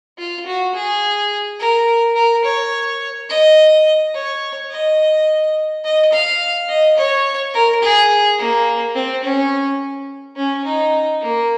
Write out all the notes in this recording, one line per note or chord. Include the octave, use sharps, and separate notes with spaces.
F4
F#4
G#4
A#4
A#4
C#5
D#5
C#5
D#5
D#5
F5
D#5
C#5
A#4
G#4
A#3
C4
C#4
C#4
D#4
A#3